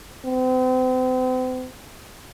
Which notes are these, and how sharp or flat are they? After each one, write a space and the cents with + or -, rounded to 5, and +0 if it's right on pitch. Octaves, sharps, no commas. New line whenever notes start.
C4 -40